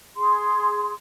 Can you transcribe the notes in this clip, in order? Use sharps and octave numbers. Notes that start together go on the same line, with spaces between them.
G#4 C6